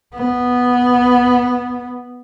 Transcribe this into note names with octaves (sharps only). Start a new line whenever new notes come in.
B3